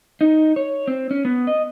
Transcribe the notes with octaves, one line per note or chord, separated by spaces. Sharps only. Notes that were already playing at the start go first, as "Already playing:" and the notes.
D#4
C#5
C4
C#4
B3
D#5